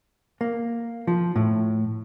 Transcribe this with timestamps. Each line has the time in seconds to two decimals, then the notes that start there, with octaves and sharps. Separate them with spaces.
0.41 A#3
1.07 F3
1.36 A2